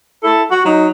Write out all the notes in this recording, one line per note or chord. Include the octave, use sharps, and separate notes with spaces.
E4 A4
F#4
F#3 D#4